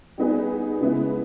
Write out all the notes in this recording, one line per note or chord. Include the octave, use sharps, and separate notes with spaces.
G3 B3 D#4 G#4
C#3 G#3 B3 E4